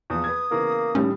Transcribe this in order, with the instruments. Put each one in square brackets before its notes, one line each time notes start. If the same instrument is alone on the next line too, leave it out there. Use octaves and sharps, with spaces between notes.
[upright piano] E2 F3 [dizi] D#6
[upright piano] B4 G#6
[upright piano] C#3 E3 B3 [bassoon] A#3
[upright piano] A2 D#3 G3 [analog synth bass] C#4